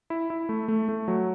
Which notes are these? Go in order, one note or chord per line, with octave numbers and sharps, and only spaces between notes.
E4
E4
A3
A3
A3
F#3